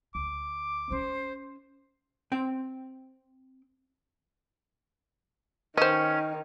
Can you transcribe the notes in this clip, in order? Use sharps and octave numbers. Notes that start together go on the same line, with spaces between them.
D2 D6
C#4 D#4 C5
C4 G5
D#3 C#4 C5 D#5